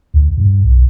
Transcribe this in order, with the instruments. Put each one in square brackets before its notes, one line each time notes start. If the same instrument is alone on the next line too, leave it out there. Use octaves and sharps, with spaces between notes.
[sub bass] D2
G2
B1